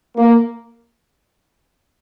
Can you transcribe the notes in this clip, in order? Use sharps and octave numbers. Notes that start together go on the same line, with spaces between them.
A#3